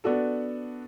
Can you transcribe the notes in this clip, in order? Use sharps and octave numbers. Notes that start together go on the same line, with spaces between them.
B3 D4 F#4 A4